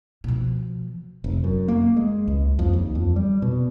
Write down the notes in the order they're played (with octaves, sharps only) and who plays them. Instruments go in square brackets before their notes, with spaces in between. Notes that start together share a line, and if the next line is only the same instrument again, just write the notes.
[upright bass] B2 F3
[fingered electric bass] F1
F#2
A#3
G#3
C#2
F2
D#2
F2
G3
B2